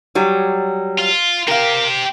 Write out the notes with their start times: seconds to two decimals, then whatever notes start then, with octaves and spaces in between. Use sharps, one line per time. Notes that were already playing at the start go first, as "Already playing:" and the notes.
0.15 F#3 G3
0.98 F4
1.48 C4 G4 A#4 F5